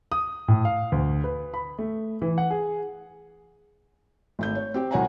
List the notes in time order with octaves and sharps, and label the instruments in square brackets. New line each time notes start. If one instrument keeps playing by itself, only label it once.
[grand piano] D#6
A2
F5
D2
B4
B5
A3
E3
F#5
G#4
[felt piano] G#1 A3 G6
C#5
C4 G4 G5
C2 F#4 C#5 F#5 G#5 A#5